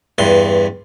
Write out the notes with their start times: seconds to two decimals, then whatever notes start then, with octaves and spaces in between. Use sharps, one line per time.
0.18 E2 G2 C6